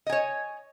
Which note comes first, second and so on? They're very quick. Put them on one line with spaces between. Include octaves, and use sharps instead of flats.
D#5 G#5 C#5